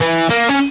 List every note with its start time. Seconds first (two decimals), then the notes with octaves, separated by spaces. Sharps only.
0.01 E3
0.30 A#3
0.49 C#4